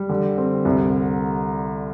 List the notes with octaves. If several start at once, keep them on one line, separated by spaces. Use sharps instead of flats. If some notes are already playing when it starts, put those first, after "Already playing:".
Already playing: G3
D3
C4
C2